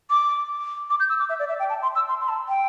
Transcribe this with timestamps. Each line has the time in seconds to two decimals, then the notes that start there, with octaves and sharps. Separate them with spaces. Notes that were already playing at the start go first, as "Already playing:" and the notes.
0.10 D6
0.90 D6
1.00 G6
1.09 E6
1.19 D6
1.29 E5
1.39 D5
1.49 E5
1.59 G5
1.69 A5
1.82 C6
1.95 E6
2.08 C6
2.20 C6
2.29 A5
2.48 G5